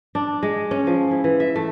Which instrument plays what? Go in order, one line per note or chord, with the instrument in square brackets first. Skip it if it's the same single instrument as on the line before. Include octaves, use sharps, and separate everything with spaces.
[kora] D4
G#3
C#4
F3
E4
E3
E5
A3